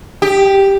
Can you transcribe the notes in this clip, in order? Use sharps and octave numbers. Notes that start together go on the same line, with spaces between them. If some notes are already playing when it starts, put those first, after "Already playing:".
G4